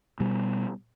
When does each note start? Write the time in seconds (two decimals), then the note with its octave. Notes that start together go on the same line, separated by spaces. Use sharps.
0.20 B2 G3